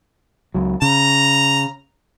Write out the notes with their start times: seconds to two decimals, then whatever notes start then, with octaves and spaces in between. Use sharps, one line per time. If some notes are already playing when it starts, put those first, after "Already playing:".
0.54 C#2 F#3
0.82 C#3 A#5